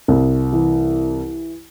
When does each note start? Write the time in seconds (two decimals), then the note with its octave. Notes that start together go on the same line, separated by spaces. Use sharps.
0.08 C2
0.53 E3